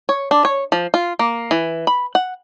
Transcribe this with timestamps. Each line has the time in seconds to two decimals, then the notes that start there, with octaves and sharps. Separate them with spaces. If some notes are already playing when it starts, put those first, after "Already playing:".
0.09 C#5
0.31 D4
0.45 C#5
0.72 F3
0.94 F4
1.19 A#3
1.51 E3
1.87 B5
2.15 F#5